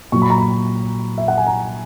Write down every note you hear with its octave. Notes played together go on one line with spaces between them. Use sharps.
A#2 F#3 C#6
B5
A#5
B5
E5
F#5
G#5
A#5